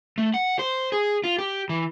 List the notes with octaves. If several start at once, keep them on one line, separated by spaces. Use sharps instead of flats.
A3
F#5
C5
G#4
F4
G4
E3